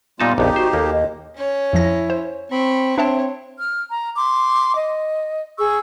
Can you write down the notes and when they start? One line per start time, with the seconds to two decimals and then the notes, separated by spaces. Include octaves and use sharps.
0.20 A#2 G3 B3 D#4 F4 A5
0.38 A#1 F2 D#4 G4
0.56 F#4 C5
0.73 D#2 A#3 A4
0.92 D#5
1.36 C#4 C#5
1.73 F2 F3 E4 A#6
2.10 C5
2.51 C4 B5 C#6
2.98 C4 D4 C#5 E5 A5
3.59 F6
3.91 A#5
4.17 C6 D6
4.75 D#5
5.58 G#4 C#6 E6